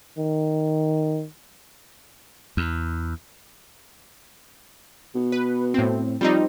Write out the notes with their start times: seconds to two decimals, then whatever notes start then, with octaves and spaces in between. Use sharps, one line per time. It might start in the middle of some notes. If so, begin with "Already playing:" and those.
0.18 D#3
2.57 E2
5.15 B2
5.32 B4
5.74 A2 C4
6.21 F3 G3 C4 D#4